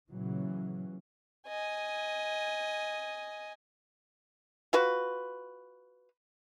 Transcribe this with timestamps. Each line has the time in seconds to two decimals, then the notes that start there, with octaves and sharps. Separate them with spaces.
0.12 A#2 C#3 E3 F#3
1.48 D#5 G#5
4.73 F4 F#4 B4